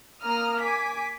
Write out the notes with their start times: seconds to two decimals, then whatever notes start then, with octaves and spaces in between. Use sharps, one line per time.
0.22 A#3 A#5 D#6 F6
0.60 G#5 D6 B6